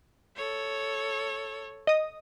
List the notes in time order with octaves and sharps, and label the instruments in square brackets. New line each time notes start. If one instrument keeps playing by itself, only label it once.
[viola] A4 C#5
[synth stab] D#5 D#6